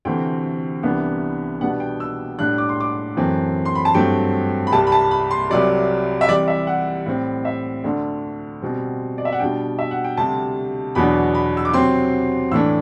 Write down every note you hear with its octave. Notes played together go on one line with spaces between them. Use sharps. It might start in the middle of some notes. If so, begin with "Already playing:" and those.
D2 C3 E3 A3 C4 G5
C2 C3 E3 B3 D4
B2 G3 B3 D4 F#5
G5
E6
A2 G3 D4 F#6
D6
C6
D6
F#2 E3 A3 C4
C6
B5
A5
G2 F#3 A3 C4 G5
B5
C2 C3 G3 A5
B5
A5
B5
C6
C2 C3 F#3 D5
E5
C3 E3 G3 D5
E5
F#5
A2 G3 C4
E5
D2 D3 A3 D4
B2 G3 C4
D5
E5
F#5
B2 G3 D4 G5
E5
F#5
G5
D2 C3 G3 A5
E2 B2 F#3 B3 D4 B5
B5
E6
D6
C3 F#3 C4 C6
A2 E3 A3 D4 E6